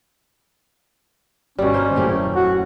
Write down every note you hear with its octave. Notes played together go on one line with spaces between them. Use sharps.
G1 B2 G3 C#4
A#3 C5
D#1 F#2 A2 A3 G4
F#4